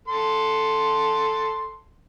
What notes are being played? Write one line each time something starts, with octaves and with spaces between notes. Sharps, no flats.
A4 C6